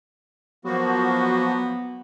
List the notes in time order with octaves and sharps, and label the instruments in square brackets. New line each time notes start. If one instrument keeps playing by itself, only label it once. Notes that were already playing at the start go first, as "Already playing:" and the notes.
[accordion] F3 A#3 F#4 [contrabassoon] F#3 [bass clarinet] B3